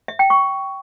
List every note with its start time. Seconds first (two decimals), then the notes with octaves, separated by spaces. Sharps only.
0.08 E5
0.19 G5
0.30 C#6